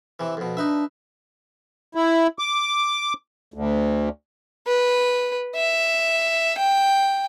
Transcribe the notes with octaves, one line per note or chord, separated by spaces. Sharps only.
C3 E3
F2 B2
D4 D#4 B4 E5
E4
D6
D2
B4
E5
G5